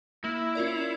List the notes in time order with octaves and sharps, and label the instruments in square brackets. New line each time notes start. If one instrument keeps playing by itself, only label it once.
[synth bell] A#3 [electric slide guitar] E4
[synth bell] C#4 F4 A#4 D5